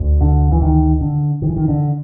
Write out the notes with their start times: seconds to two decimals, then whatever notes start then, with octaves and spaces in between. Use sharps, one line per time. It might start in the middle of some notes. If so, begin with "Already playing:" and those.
Already playing: D2
0.21 D3
0.52 E3
0.62 D#3
1.01 D3
1.42 D#3
1.49 E3
1.56 D#3
1.68 D3